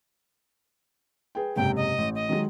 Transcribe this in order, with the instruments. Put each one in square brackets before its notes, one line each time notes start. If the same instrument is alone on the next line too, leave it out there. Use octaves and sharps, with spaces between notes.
[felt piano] G#4 B4 G5
[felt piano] F#1 G#2 C3 [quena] G5
[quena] D#5
[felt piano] A1
[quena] D#5
[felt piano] D#3 F#3 G#3